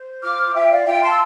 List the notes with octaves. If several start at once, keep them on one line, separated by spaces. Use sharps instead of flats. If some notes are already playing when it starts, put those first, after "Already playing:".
Already playing: C5
F4 D6 F6
F4 E5 G5
D5 F5
F4 E5 G5
A5 C6
E6